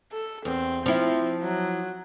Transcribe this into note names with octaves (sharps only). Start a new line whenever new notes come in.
A4
E2 C4
F3 C4 E4
F#3